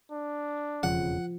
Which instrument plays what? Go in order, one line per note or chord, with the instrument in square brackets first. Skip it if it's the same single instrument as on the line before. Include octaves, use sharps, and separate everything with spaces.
[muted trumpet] D4
[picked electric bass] E1 F2 C#3 [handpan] F3 [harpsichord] F#5